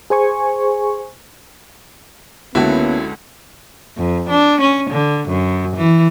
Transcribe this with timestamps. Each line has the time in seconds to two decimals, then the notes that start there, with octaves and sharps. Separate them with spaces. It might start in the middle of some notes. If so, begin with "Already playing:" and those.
0.10 G#4 C5 G#5 C#6
2.55 C#2 D3 A#3 B3 C#4 E4 F#4 A4
3.97 F2
4.29 D4
4.61 C#4
4.90 D3
5.28 F#2
5.76 E3